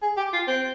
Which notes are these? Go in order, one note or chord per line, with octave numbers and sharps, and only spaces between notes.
G#4
G4
F4
C4